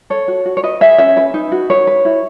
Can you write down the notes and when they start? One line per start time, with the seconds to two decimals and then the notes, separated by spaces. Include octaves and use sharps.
0.10 A4 C#5
0.28 F#4
0.46 F#4
0.57 C#5
0.63 B4 D#5
0.81 G#4 E5
0.98 C#4 E5
1.17 B4
1.34 D#4
1.52 F#4
1.70 B4 C#5
1.87 B4
2.05 E4